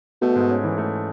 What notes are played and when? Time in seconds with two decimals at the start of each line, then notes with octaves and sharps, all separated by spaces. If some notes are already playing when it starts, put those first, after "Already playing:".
0.22 B2 A3
0.35 G#2
0.50 C#4
0.64 E3
0.78 A3